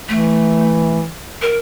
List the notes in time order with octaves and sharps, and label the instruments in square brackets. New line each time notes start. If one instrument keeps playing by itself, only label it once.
[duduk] E3 [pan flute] A3
[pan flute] A#4